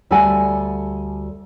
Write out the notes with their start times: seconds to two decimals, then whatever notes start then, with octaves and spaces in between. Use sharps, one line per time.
0.11 D2 G3 A4 D5 F#5 G#5